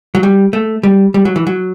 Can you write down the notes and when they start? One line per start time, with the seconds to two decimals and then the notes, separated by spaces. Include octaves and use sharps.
0.15 F#3
0.23 G3
0.53 A3
0.83 G3
1.14 G3
1.25 F#3
1.36 E3
1.47 F#3